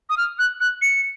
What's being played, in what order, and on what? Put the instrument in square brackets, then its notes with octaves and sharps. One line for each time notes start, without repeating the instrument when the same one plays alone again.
[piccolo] D#6
F6
F#6
F#6
C#7